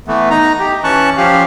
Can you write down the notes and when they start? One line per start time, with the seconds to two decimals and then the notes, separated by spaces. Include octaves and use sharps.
0.08 E3 A3 B3
0.31 D#4 A#5
0.59 G4
0.84 E3 C#4 A5 C#6 F#6
1.18 F3 C#4 G4 F5